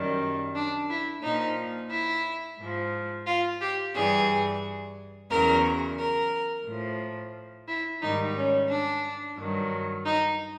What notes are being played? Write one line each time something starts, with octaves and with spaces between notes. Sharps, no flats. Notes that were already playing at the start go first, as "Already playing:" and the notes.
Already playing: F#2 D#3 G3
D4
E4
A#2 F3 D#4
E4
G#2 F3
F4
G4
G2 E3 G3 G#4
E2 C#3 F#3 A#4
A#4
A2 F3
E4
G#2 D#3 G3 D#4
C#4
D4
G2 D#3 F#3
D#4